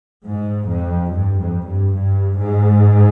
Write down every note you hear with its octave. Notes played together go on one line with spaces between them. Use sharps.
G#2
F2
G2
F2
G2
G2
G#2